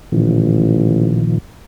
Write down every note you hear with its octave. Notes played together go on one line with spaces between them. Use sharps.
A1 A#2 D#3 F3